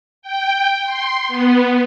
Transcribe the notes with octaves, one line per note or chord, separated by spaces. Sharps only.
G5
C6
B3